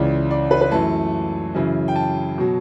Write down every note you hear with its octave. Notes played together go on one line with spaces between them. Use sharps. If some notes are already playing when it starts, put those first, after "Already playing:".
Already playing: C#2 C#3 E3 D5
D5
B4
B4
F#2 E3 A3 A5
F#2 C#3 E3
G5
A5
B2 F#3